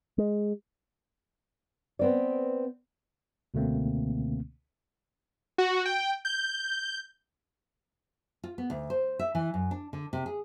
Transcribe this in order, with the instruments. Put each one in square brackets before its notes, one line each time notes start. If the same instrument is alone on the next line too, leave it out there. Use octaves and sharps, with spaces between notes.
[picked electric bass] G#3
[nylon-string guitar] B3 C4 D5
[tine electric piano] C#2 B2 D3 A3 A#3 C4
[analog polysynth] F#4
G5
G6
G6
[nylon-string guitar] F4
B3
D2
C5
E5
E3
F#2
D4
D3
C3
G#4